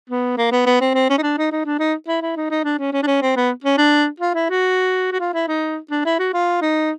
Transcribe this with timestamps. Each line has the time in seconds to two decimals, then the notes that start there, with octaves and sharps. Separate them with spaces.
0.10 B3
0.38 A#3
0.51 B3
0.66 B3
0.81 C4
0.94 C4
1.09 C#4
1.18 D#4
1.22 D4
1.38 D#4
1.52 D#4
1.66 D4
1.79 D#4
2.08 E4
2.22 E4
2.36 D#4
2.50 D#4
2.64 D4
2.79 C#4
2.93 C#4
3.03 D4
3.07 C#4
3.22 C4
3.36 B3
3.64 C#4
3.77 D4
4.20 F4
4.34 E4
4.49 F#4
5.12 F#4
5.20 F4
5.34 E4
5.48 D#4
5.90 D4
6.05 E4
6.19 F#4
6.34 F4
6.62 D#4